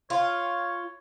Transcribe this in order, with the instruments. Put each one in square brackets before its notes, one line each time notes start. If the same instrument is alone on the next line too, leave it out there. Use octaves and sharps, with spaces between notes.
[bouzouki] F4 [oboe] C#5